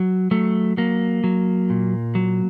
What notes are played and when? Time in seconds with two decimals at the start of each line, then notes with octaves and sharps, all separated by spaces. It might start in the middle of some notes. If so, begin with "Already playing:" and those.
Already playing: F#3
0.31 F#3 A3
0.77 F#3 A#3
1.24 F#3
1.70 A#2
2.15 F#3